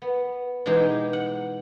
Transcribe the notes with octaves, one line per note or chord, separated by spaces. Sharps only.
B3
B2 E3 G#3 D#4 G4
F#5